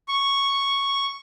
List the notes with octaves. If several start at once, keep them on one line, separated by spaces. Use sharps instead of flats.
C#6